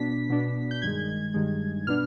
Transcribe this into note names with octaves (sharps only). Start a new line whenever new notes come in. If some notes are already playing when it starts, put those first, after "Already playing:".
Already playing: B2 B3 D4 B6
B2 B3 D4
G6
G2 D#3 G#3 G#6
G2 D#3 G#3
B2 B3 D4 F6